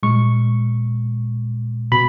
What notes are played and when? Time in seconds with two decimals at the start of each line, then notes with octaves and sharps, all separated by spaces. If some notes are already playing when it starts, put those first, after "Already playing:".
0.03 A#2 G#3 C#6
1.92 B2 B5